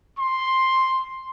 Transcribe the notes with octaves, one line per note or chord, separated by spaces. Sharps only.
C6